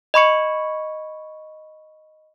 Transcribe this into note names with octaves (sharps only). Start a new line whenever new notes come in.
D#5 B5 C#6 C#7